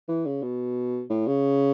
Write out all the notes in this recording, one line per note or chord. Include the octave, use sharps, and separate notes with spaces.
E3
C#3
B2
A2
C#3